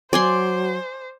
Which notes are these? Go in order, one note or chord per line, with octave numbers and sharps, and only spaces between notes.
F#3 C5 D5 G#5 C6